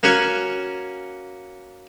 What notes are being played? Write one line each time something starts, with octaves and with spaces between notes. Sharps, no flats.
A#3 C#4 F#4 F#5 G#5